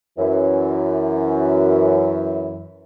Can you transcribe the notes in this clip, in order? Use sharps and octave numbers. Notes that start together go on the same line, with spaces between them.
F#2 E3